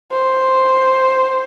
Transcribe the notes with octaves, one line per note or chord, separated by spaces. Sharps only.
C5